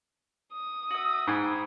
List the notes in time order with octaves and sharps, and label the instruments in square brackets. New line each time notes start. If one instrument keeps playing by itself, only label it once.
[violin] D#6
[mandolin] F#4 E5
[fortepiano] G#2 [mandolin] G5 G#5 B5